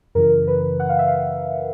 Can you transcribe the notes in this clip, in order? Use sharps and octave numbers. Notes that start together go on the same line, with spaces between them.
F#2 C#3 E3 A#4
B4
F#5
F5
E5
F5